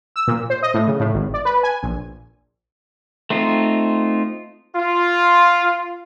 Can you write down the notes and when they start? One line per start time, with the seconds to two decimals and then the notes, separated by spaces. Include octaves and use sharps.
0.16 E6
0.27 A#2
0.50 C5
0.63 D#5
0.74 A2
0.87 C#3
1.00 A2
1.14 G#1
1.34 D5
1.45 B4
1.63 G#5
1.83 A#1
3.30 A3 C4 D#4 F4
4.76 F4